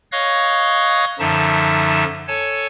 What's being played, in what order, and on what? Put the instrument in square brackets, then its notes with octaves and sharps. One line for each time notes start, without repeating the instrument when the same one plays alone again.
[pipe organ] C#5 D#5 F5 C#6 D#6 F#6
F#2 D3 F3 D#4 E5 A5
A4 C#5 G#5 A5